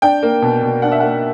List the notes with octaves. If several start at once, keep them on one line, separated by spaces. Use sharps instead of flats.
D4 G5
A#3
B2
B2
D4 F#5
E5
A#3 F#5